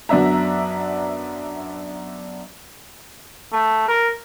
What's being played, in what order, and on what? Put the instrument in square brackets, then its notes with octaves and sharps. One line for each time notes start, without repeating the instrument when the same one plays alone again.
[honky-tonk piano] F#2 B3 D4 E5 A#5
[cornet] A3
A#4